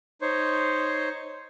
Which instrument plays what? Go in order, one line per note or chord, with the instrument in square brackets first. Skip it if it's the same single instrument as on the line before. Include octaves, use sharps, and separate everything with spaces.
[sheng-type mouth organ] D#4 C5 C#5